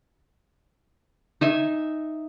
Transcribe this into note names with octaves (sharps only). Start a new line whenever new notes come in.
D#4 E5 G#5